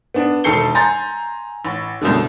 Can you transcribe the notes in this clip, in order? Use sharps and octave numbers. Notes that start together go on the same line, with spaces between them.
B3 D4
E1 D#3 A4 C7 C#7 G7
G#5 A#5 C6 G6 A6
A1
C2 F#2 B2 D3